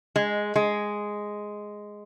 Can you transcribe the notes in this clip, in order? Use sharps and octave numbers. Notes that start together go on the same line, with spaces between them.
G#3
G#3